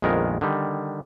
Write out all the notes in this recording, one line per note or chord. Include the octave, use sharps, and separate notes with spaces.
A#1 F2 D#3 G#3 B3 A#4
D3 D#3 G3